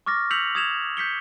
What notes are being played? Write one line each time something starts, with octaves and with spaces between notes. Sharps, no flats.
C#6 D6 F6 A6 A#6
E6 G6 B6 C#7 F7 F#7
D#6 G#6 E7 F7
G6 B6 C#7 G7